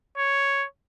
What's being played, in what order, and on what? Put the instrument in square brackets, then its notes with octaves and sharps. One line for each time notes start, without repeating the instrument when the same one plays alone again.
[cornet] C#5